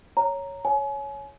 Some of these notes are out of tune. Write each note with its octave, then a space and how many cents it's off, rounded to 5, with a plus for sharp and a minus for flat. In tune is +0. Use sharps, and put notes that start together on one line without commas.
C#5 +0 A#5 -5
C#5 +0 G#5 +35